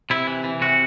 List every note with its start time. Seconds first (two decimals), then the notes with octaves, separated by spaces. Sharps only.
0.10 C3 E4
0.27 E3
0.44 E3
0.61 C3 F#4